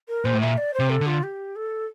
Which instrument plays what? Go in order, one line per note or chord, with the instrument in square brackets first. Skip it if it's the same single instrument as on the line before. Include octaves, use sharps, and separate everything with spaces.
[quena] A#4
[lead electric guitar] A#2 [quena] C5
[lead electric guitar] A2
[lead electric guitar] A#2 [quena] E5
[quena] D5
C5
[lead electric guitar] C3
[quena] A4
[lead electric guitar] D3
[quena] F4
G4
A4